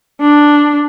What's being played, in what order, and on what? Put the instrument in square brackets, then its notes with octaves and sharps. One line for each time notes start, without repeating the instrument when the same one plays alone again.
[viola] D4